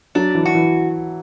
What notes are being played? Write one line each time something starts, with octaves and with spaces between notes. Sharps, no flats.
F#3 D4
E3
F#4
E3